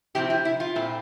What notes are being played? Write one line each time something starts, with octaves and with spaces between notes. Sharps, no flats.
C3 F3 C4 E4 G4
E4
E4
F4
A#2 A3 C4 E4